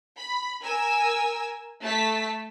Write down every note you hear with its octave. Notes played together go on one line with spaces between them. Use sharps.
B5
A#4 G#5 E6
A3 A5 B6